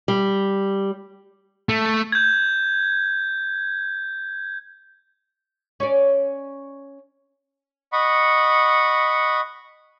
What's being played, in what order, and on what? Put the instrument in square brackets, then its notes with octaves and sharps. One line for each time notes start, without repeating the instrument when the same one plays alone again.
[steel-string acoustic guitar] G3
[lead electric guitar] A3
[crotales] G6 G#6
[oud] C#4 C#5 D5
[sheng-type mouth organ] D#5 F#5 B5 C#6